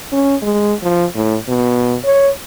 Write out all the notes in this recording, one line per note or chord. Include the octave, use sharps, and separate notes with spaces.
C#4
G#3
F3
A2
B2
C#5